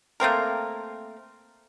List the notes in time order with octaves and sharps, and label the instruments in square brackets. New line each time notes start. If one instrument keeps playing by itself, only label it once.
[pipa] A3 A#3 C4 A#4